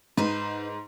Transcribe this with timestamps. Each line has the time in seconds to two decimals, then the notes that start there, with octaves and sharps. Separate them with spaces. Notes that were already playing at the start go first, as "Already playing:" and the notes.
0.18 G#2 D#4 B4 C5